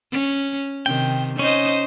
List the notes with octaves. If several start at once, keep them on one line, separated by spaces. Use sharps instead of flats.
C#4
C3 D#3 G5
C#4 D#4 C5 D#5